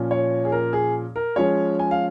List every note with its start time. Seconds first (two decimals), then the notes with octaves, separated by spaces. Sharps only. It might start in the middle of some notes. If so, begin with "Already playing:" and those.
Already playing: A#2 F3 C#4
0.11 C#5
0.45 G#4
0.52 A#4
0.73 G#4
1.16 A#4
1.36 F3 G#3 C#4 C#5
1.79 G#5
1.91 F5